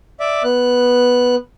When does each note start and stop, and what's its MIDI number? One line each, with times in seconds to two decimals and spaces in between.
0.20 0.43 74
0.20 0.43 76
0.20 0.43 86
0.44 1.35 59
0.44 1.35 90